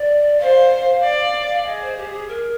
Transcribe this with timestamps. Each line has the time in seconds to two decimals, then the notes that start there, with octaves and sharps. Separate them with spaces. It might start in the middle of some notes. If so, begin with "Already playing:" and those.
Already playing: D5
0.41 C5 F5
1.03 D5
1.53 F5
1.66 G#4 D#5
1.82 C5
1.97 G4
2.13 G#4
2.28 A#4